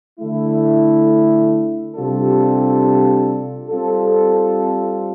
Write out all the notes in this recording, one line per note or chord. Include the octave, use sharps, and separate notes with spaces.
D3 A3 E4
C3 G3 D4 F4 A4
G3 C4 F4 A4